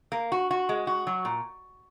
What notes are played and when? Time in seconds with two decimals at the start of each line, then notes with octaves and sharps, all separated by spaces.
0.12 A#3
0.32 F#4
0.51 F#4
0.69 G#3
0.87 F#4
1.07 F#3
1.25 A#2